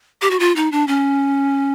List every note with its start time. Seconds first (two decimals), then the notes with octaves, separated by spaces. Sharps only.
0.22 G4
0.31 F#4
0.40 F4
0.56 D#4
0.72 D4
0.88 C#4